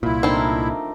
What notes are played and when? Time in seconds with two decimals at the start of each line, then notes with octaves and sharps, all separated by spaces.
0.03 C2 A#2 E4 F4
0.23 A3 C4 D4 D#4 A#4